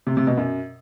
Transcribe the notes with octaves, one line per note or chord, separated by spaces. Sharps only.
C3
C3
B2
F#2